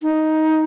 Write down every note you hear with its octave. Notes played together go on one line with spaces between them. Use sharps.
D#4